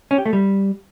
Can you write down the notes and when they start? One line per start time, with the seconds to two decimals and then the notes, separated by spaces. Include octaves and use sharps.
0.11 C#4
0.18 G4
0.26 A3
0.33 G3